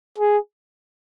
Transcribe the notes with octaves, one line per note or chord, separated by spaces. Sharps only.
G#4